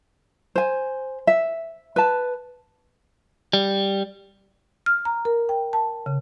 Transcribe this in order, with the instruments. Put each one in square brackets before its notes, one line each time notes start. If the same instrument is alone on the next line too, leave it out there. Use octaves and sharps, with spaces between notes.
[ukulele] C5 G#5
E5
B4 A5
[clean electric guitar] G3
[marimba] F6
A#5
A#4
G5
A5
C#3